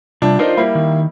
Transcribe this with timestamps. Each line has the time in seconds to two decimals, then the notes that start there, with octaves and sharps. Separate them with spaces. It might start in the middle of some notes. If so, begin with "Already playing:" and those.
0.22 C3 F3 G3 D4
0.39 D4 D#4 F4 A#4 C5
0.57 G3 A#3 E4
0.75 D#3